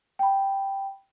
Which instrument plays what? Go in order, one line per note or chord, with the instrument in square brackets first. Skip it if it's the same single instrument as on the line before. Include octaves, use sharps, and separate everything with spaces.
[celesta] G5 B5